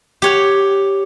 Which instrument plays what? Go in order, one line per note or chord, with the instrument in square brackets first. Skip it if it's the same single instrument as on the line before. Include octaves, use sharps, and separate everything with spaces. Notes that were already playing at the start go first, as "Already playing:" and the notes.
[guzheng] G4 C#5 F#5